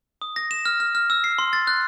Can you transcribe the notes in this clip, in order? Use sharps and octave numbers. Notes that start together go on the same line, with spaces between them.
D#6
A#6
E7
F6
F6
F6
E6
C7
C6
A6
F#6